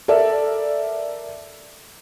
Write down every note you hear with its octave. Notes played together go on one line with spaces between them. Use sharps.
A4 A#4 D5 E5